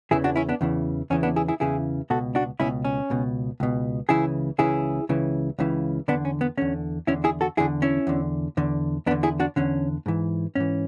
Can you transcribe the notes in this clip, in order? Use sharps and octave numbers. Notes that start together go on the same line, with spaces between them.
E2 C#3 E3 E4 G#4
D4 F#4
C#4 E4
B3 D4
E2 C#3 E3
E2 C#3 E3 C#4
B3 D4
E4 G#4
E4 G#4
E2 C#3 E3 E4 G#4
C#2 B2 F#4 A4
D4 F#4
C#2 B2 C#4 E4
C#4
C#2 B2
C#2 B2
C#2 C#3 E3 E4 G#4
C#2 C#3 E3 E4 G#4
C#2 C#3 E3
C#2 C#3 E3
E2 D3 B3 D4
C#4
B3
E2 D3 C#4
E2 D3 C#4 E4
E4 G#4
F#4 A4
E2 D3 E4 G#4
C#4 E4
E2 D3
E2 D3
E2 D3 B3 D4
E4 G#4
D4 F#4
E2 D3 C#4
G#2 E3
G#2 E3 C#4